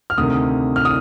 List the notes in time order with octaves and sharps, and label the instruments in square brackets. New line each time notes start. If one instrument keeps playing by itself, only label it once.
[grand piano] F6
D2 C3 D#3 D#6
F6
D#6